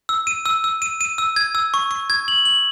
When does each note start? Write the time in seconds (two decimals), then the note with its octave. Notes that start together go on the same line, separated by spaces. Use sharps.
0.09 E6
0.27 D#7
0.46 E6
0.64 E6
0.82 D#7
1.01 D#7
1.18 E6
1.36 G#6
1.55 E6
1.74 C#6
1.91 C#6
2.10 G#6
2.28 F#7
2.45 F#7